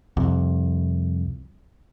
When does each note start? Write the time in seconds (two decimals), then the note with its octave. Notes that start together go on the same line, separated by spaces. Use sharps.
0.17 C2 F2